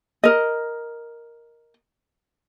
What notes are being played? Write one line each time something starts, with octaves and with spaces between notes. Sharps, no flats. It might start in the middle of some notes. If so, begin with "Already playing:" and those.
A#4 D#5